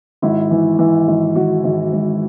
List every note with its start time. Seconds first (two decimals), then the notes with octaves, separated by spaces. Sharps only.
0.22 G#1 E4
0.51 E3
0.79 E3
1.08 G#1
1.35 G#1 F#4
1.64 G#1
1.93 G#1